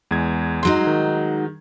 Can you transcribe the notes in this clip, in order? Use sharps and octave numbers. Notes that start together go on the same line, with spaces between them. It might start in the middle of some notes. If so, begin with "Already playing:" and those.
E2 G#3 G#6
G#2 F#3 D#4 C6
D#3